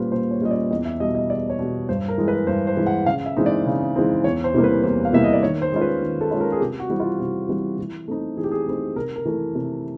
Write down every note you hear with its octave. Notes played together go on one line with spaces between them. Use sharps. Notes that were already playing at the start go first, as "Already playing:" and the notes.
Already playing: A#2 G3 A#3 C#4 F4 B4 C5
A#2 C5
C#5
G3 A#3 C#4 F4 D#5
D5
E2 D#5
E5
B2 G3 D#5
D#5
E2 D5
C#5
B2 G3
G2 C5
A#4
E3 G#3
B4
G2 C5
C5
E3 G#3
F#5
C#3 F5
E5
E3 G#3 C4 D#4
D5
C#3
E3 G#3 C4 D#4
E2 C#5
C5
C3 E3 G3 A#3
B4
E2 C5
F5
C3 E3 G3 A#3 E5
D#5
D5
D#3 C#5
C5
G#3 C#4 F4
B4
D#3
A4
G#3 C#4 F4
A#4
G#4
C3 G4
F#4
E3 G3 C4
F4
C3 F#4
E3 G3 C4
E3
A3 C4 D#4
E3 G#4
G4
G#4
A3 C4 D#4
C3 A#4
A#4
E3 A3
C3